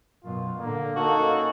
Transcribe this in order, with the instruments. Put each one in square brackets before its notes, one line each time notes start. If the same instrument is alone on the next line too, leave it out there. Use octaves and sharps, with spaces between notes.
[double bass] F#2 B2 [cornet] F4
[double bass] A#2 D3 [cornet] A#3
[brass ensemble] A#3 C#4 [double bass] D#4 [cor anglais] F#4 [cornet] A4